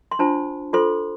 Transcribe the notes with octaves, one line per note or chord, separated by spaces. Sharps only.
C6
D4 F4 C5 A5
F4 A4 C5 C6